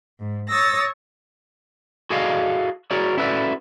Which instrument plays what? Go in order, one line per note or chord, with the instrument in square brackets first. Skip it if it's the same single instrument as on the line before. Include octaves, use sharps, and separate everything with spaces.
[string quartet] G#2
C#5 D#6 E6 A6 A#6
[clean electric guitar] F#4 G#4 A4 D5 D#5 F5
F#4 G#4 A#4 C#5 D5
C#4 E4 F#4 A4 B4 D5